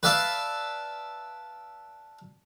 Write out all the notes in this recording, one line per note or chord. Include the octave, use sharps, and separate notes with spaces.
B4 D5 E5 F5 A5